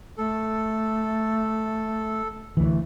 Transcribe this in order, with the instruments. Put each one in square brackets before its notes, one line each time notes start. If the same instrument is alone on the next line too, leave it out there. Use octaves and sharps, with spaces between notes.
[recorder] A3 [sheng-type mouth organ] A4
[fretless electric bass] D2 E3 [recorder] A3